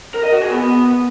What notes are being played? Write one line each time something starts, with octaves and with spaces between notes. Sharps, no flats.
A#4
D#5
F#4
G#4
B3